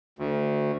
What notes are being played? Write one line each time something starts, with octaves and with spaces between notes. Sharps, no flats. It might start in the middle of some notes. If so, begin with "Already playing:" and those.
D2